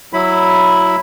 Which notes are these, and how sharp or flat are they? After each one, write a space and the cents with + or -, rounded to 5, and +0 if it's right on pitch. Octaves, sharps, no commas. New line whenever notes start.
F#3 +0 E4 +0 B5 +0